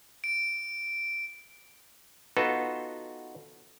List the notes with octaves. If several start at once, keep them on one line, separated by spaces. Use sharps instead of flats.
D7
B3 D#4 F4 F#4 A4 B4